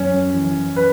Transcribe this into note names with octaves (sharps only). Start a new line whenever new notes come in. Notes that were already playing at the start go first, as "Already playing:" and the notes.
Already playing: F#2 C#4
E3
B4